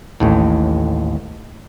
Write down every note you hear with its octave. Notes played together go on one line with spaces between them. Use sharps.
A1 D#2 A2